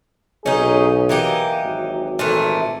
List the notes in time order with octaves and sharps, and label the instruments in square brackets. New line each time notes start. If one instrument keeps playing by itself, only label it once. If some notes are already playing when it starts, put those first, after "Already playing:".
[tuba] B1 [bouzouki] C#4 D#4 [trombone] G#4
[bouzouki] E3 D#4 G4 [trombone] A#3
[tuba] G#1 [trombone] F#3
[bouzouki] A#2 E3 A3